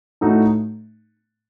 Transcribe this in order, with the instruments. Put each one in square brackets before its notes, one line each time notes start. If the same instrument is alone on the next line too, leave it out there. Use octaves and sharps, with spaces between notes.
[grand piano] A2 A3 D#4 F#4